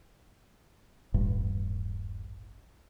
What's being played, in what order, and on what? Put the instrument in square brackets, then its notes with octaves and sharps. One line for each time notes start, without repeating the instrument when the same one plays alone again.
[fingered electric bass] D#1 A1 G2